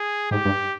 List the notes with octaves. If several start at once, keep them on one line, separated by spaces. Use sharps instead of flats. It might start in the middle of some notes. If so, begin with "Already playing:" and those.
Already playing: G#4
G#2 G4
G2